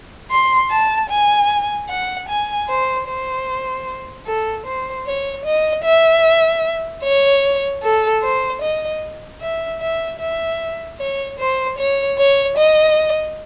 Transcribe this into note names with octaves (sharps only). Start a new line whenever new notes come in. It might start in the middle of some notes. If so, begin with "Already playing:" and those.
C6
A5
G#5
F#5
G#5
C5
C5
A4
C5
C#5
D#5
E5
C#5
A4
C5
D#5
E5
E5
E5
C#5
C5
C#5
C#5
D#5